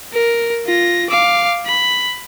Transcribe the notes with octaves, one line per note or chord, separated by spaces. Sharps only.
A#4
F4 A#6
F5 D6
B5